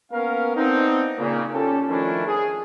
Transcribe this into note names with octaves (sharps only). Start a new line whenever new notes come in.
A#3 B3 C#4 A#4 F5
B3 C4 D4 D#4
A#2 C#3 A#3
C#4 F4 G4 A4
D#3 F3 A3 C#4 D4 E4
G#4